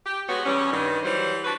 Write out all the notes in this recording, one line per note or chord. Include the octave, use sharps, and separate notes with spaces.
G4
G#3 B3 F#4 G4 C#5
E2 G3 C#4
G2 D#3
E3 F#3 G3 C5
D4 F#4 B4